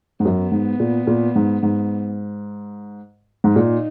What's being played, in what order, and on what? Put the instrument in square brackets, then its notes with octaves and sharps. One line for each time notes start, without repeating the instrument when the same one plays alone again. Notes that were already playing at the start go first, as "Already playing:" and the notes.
[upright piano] G#2
[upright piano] F#2 [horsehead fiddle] B3
[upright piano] G#2
A#2
A#2
G#2
G#2
G#2
[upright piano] A#2 [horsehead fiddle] D#4